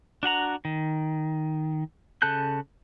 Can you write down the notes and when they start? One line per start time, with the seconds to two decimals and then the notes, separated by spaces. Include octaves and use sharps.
0.23 D4 F#4 F#5 A#5
0.65 D#3
2.22 C#3 A4 A5 F#6 G6